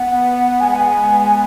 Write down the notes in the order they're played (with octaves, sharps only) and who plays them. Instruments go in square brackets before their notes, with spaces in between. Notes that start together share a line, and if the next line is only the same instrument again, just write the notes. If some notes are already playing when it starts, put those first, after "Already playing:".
Already playing: [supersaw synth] B3 [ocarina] F#5
[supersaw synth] B3
[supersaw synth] G#3 [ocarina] G#5
[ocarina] F#5
G#5